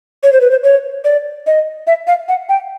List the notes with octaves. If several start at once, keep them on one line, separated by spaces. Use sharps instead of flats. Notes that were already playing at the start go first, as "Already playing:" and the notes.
C#5
C5
B4
C5
C#5
D5
D#5
E5
F5
F#5
G5